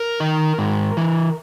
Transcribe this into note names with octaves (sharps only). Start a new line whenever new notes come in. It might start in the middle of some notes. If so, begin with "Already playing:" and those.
Already playing: A#4
D#3
G#2
E3